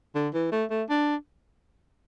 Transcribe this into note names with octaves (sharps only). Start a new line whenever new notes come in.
D3
E3
A3
A3
D4